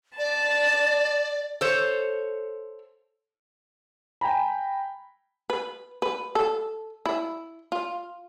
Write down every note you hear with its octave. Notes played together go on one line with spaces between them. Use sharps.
D5 A5
A4 C5 C#5
G5 G#5 A#5 B5
B4
B4
A4
E4
F4